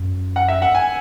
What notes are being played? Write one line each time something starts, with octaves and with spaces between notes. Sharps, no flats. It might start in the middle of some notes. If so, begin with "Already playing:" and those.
Already playing: F#2
F#5
E5
F#5
G#5